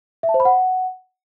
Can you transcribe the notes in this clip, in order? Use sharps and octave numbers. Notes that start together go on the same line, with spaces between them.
E5
A5
C5
B5
F#5